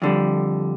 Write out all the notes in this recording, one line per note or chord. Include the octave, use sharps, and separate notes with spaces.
F2 D3 G3